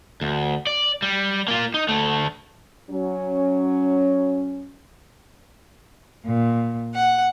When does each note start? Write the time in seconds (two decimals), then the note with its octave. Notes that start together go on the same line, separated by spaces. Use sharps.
0.21 D2
0.67 D5
1.02 G3
1.48 A#3 F4
1.74 D#4
1.89 D2 A3
2.90 F#3 C#4
6.25 A#2
6.93 F#5